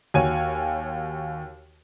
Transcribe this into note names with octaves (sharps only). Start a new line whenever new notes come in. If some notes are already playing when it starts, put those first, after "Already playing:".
D#2 F#4 C#5 G5 G#5 D#7